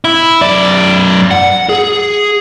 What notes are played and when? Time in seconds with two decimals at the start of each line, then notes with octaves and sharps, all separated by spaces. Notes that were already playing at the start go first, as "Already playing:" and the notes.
0.05 E4
0.41 F#2 D5
1.31 F#5
1.69 G#4